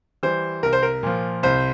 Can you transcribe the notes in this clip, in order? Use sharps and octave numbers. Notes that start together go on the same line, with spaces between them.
E3 G3 C5
C2 A#4
C5
A#4
A#2 F3
C2 C5